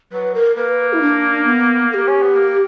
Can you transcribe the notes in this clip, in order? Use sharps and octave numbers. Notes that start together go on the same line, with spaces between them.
F#3 B4
A#4
A#3 B4
E4
D4
B3
A#4
G4
C#4
B3
A#3